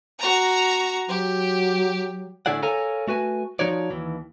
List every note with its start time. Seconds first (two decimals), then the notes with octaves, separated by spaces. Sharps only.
0.19 F#4 A#5
1.08 F#3 G4
2.46 A2 D3 E4 G#4 D5 F#5
2.63 A4 A#4 C#5 F5 G#5 A#5
3.08 A3 F#4 B4 G#5
3.59 F3 D#4 F#4 C#5 D5
3.91 D#2 E3